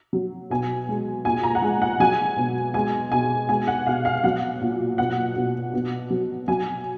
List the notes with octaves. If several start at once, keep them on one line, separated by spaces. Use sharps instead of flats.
F#3
B2 G#5
G#3
A#2 G#5
A#5
F#5
G#3 G#5
F#5
F#3 G#5
B2
G#3 G#5
B2 G#5
G#3 G#5
F#5
B2 F5
F5
F#3 F#5
A#2
B2 F#5
B2
B2
F#3
F#3 G#5